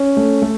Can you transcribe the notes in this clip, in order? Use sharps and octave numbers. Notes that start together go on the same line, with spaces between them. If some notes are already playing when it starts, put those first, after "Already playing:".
Already playing: C#4
A3
A3